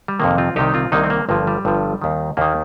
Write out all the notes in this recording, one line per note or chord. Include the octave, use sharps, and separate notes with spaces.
G3
F2 C3 D#3 A#3
C4 F4
C2 C3 D#3 D#4 G4
C4 F4
C2 C3 D#3 A#3 D#4
C4
A#3
G1 G2 F3 A#3
G3
G1 G2 F3
D#2 D#3
D#2 D#3 A#3